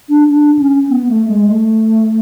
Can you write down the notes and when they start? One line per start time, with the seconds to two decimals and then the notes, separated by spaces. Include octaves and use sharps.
0.09 D4
0.30 D4
0.59 C#4
0.89 B3
1.09 A3
1.29 G#3
1.48 A3